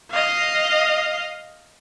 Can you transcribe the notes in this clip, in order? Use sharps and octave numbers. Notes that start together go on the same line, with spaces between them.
D#5 F5